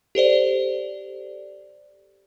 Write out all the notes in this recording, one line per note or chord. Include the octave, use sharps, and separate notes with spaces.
G4 A4 C5 D5